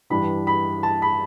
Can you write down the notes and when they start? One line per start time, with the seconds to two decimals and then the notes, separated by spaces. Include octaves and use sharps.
0.10 G2 E3 G3 D4 B5
0.47 B5
0.83 A5
1.02 B5